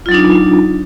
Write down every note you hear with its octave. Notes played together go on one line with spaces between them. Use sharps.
F#3 D4 D#4 F4